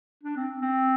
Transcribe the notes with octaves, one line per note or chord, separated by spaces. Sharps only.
D4
C4
C4